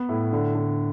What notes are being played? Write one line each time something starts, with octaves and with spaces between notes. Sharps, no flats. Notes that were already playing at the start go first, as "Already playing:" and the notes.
Already playing: B3
A2
D3
D3